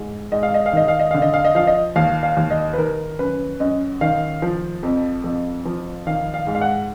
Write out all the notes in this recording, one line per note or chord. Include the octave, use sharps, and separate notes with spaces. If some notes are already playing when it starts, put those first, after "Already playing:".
Already playing: G#2
G#2 D#5
F5
D#5
F5
D#3 D#5
F5
D#5
D3 F5
D#5
F5
D#5
F3 F5
D#5
D#2 F5
F5
D#2
D#5
B4
D#3 A#4
F#2 B4
F#2 D#5
D#3 F5
F3
F2
F2
F3
D#3 F5
F5
G#2
F5
F#5